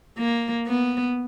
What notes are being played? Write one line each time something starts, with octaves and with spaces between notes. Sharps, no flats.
A#3
B3